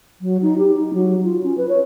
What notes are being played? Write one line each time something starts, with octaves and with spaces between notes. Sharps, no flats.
F#3
D#4
G4
D#4
F#3
F4
C#4
B4
C#5